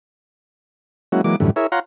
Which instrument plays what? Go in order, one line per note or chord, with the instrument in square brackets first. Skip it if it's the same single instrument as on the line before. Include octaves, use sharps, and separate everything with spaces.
[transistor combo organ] F#3 G#3 A#3 C#4 E4 F#4
E3 F#3 G#3 A#3 D6
F#2 A2 D3 E3 G3
E4 G#4 A#4 C#5 E5
F4 C#5 F5 F#5 A#5 C6